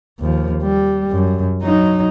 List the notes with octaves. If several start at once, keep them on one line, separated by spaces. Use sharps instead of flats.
D#2 F3
G3
F#2
F#3 D#4